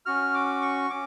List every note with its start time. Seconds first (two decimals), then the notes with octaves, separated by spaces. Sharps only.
0.06 C#4 F#4 F6
0.34 D6
0.62 C#6
0.90 C#4 D6